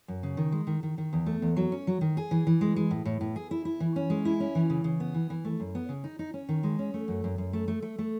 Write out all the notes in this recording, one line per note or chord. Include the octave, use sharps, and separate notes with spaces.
F#2
C#3
D#3
G#3
D#3
D#3
D#3
E2
A3
E2
F#3
C#4
F#3
D#3
G#4
E3
E3
G#3
G#3
A2
A2
A2
G#4
E4
E4
E3
C#4
G#3
E4
C#4
E3
C#3
C#3
B3
E3
E3
A3
F#2
B3
C#3
D#4
D#4
C#4
D#3
G#3
C#4
A3
F#2
F#2
F#2
A3
A3
A3
A3